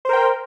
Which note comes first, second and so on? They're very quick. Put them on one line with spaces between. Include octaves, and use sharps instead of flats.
C5 A#4 G5